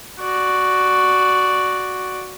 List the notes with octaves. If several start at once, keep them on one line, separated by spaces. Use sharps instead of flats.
F#4 D5